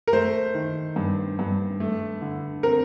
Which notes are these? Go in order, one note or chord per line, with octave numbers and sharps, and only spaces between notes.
A#4
A3 C5
D#3
G2
G2
A3
D3
C4 A#4